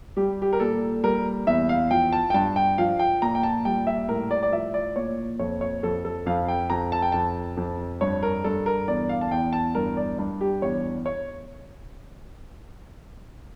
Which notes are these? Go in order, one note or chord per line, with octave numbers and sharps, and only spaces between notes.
G3 G4
G4
A#4
A#2 A4
G3 A#4
E2 E5
F5
F3 G5
A5
G5
G2 A5
G5
F3 F5
G5
A#2 A#5
G5
A5
G3 G5
E5
A2 A#4
D5
D5
F3 E5
D5
A#2 C#5
F2 C#5
C#5
F2 A4
A4
F2 F5
G5
F2 A#5
A5
G5
F2 A5
F2
G2 C#5
A#4
G2 A4
A#4
E2 D5
F5
A5
E2 G5
A5
G2 A#4
D5
G2
G4
E2 C#5
C#5